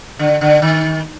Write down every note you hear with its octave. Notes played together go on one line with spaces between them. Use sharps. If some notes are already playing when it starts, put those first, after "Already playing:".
D3
D3
D#3